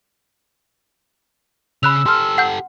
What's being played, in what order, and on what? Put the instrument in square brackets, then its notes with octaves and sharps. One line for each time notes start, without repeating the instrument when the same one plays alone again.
[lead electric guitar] C#3 [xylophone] B5 F#6 F7 [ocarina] E6
[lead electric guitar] G4 A4 [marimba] C6 F6
[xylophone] F#5 G6